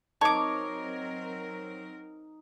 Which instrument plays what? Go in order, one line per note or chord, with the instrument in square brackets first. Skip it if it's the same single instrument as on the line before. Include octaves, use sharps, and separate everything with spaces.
[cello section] F#3 C4 A#4 [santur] D#4 [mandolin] C#5 D6 [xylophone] A5 C#6